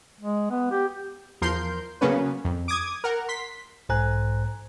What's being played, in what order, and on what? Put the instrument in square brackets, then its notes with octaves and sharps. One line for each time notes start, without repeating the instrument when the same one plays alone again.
[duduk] G#3
B3
G4
[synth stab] E2 F3 A#4 C6 G6
C#3 F#3 A#3 B3 C#4 B4
F2
D6 D#6 G#6
A#4 F#5
C6 B6
[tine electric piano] B1 G#2 C5 G#5 A#5 F#6